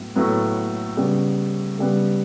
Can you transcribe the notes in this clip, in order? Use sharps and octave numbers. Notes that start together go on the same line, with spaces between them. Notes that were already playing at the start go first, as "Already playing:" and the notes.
Already playing: A2 F#3 B3
A2 F#3 B3
C#3 G3 B3
C#3 G3 B3